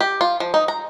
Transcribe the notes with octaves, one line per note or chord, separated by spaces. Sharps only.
G4
F4
F3
D#4
A#5